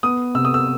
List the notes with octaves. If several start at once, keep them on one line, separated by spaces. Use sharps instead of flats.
B3 D#6
C3 E6
D#6
E6